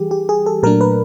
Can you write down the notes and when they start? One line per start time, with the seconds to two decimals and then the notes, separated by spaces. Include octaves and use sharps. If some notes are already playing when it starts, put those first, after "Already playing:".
Already playing: E3 G3 G4 G#4
0.11 G4
0.29 G#4
0.46 A4
0.63 A#2 F#3 A3 D4 A#4
0.81 B4